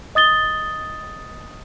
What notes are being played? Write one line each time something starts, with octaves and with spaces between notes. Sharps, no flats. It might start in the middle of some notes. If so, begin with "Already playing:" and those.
D#5 D#6 A6 G7